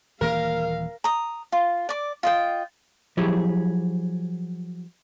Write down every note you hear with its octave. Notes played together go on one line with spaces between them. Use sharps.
D#1 E3 A#3 A#4 F5
A#5 D#6
F4
D5 D6
F4 D#5 G5
F3 F#3 E4 G4 G#4